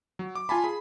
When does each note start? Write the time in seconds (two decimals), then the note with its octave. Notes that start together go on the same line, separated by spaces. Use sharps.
0.19 F#3
0.35 D6
0.49 F4 G#5 A5 B5
0.64 G#4 B5